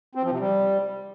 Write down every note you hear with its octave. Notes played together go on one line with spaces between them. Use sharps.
C4
F3
C3
G3